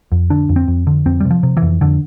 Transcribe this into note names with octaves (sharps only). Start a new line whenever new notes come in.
F2
D3 D4
F2
C4
F2
D3
F2 C4
C3 G3
F3
C3
E3
F2
F2 D3